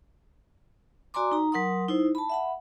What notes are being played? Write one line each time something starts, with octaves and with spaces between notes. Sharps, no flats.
F#4 D5 G#5 A#5 C6 D6
D#4 A#5
F#3 A#4 F#5 C6 D#6
D#4 E4 C5
A5 B5
E5 F#5 B5